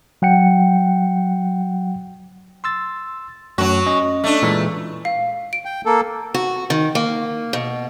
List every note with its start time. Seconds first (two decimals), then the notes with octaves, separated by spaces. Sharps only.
0.22 F#3 F#5 G5 C#7
2.64 C6 E6 A6
3.58 F#2 F#3 A3 F#4
3.87 C#4 D#5
4.24 A3 D4
4.42 A#2 E3 G#3
5.05 F5
5.53 D7
5.65 G5
5.85 A#3 A4
6.34 F#4
6.70 D#3
6.95 A#3
7.53 B2